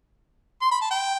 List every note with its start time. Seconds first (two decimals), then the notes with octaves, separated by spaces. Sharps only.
0.62 C6
0.71 B5
0.81 A5
0.91 G5